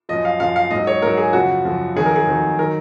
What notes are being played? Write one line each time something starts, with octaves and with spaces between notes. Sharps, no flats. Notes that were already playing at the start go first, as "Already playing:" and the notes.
F#2 F3 D#5
F5
F#2 F3 F5
F5
G#2 F#3 D#5
C#5
G#2 F#3 A#4
G#4
F#2 C#3 F3 F#4
F#2 C#3 F3
F2 D#3 F#3 G#4
A#4
G#4
F2 D#3 F#3
D#3 F#3 A#4